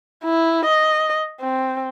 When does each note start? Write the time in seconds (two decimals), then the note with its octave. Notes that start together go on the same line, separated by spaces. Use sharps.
0.24 E4
0.65 D#5
1.41 C4